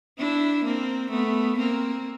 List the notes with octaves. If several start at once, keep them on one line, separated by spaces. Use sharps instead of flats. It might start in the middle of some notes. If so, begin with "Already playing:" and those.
D4 E4
A#3 C4
A3 B3
A#3 C4